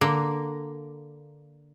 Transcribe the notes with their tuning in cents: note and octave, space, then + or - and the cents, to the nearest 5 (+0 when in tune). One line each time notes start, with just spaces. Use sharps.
D3 +0 A#3 +0